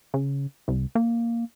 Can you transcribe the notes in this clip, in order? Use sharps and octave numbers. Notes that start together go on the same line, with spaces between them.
C#3
C2
A#3